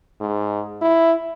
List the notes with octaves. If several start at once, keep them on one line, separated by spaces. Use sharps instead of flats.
G#2
E4